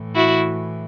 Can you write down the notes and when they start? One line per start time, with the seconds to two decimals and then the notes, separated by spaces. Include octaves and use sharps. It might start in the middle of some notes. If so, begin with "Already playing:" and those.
Already playing: A2 E3
0.15 E4 F#4